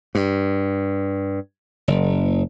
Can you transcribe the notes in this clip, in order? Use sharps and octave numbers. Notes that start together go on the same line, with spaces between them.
G2
F#1